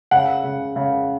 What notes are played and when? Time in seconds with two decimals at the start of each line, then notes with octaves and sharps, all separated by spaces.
0.11 C#3 F#5
0.44 C#3
0.76 C#3